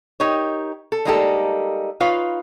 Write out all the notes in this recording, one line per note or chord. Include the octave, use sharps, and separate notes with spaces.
D#4 G4 A#4 C#5
A4
G3 G#3 A#3 D#4 G4 A4
D#4 F4 B4 C#5 F5